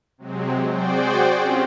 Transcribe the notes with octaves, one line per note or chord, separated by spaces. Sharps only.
C3 F#3 G#3 C4
F#4 G#4 C5 D5 G5
C4 C#4 F4 G4